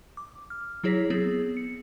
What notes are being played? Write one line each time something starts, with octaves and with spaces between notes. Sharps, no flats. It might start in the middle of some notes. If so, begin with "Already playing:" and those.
D6
F6
F#3 E4 G#4 C#5 A#6 B6
B3 C4 G#4
C#7